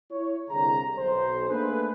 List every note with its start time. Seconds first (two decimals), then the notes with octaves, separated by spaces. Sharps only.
0.11 E4 C#5
0.50 C2 D3 G#4 A#5
0.97 B1 C5
1.49 A3 A#3 D4 G#4 A4 B4